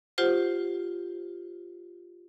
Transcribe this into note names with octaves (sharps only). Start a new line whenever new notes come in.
F4 G4 C5 F#5